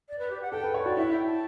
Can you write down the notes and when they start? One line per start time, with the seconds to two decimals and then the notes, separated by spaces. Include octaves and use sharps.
0.09 D5
0.19 B4
0.30 G4
0.42 F#5
0.52 A4 G5
0.63 B4
0.74 C#5
0.82 F#4 D5
0.97 E4 E5
1.12 G5
1.27 A5